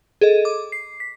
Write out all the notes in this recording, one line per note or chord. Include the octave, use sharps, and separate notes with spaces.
G#4 A4 D#5
D6
C7
B6